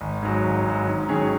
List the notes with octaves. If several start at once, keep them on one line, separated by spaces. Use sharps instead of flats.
G#1
G#2 F#3
G#1
G#2 F#3
G#2
D#3 F#3 C#4 G#4